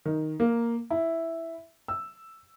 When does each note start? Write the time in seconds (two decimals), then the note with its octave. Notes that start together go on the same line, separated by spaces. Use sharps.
0.05 D#3
0.40 A#3
0.90 E4
1.88 E6